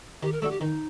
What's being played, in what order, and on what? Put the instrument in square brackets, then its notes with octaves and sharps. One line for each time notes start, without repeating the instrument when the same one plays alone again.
[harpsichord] D#3 [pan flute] G4
[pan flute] A#4
[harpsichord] A3 D4 F#4 [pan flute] A4
[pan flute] G4
[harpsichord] D#3 [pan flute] D#4